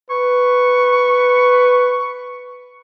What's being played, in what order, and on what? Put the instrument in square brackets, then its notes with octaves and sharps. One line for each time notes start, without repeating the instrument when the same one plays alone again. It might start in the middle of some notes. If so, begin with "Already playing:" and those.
[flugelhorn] B4 [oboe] C#6